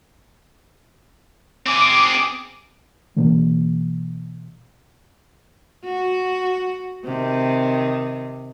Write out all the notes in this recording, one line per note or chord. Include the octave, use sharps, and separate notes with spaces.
C4 G#4 D6
B2 E3 A#3 B3
F#4
C3 D#3